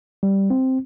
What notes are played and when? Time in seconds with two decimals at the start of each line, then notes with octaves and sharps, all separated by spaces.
0.23 G3
0.50 C4